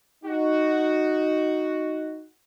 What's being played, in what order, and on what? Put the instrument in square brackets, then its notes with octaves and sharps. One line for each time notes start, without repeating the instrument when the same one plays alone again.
[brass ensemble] D#4 F#4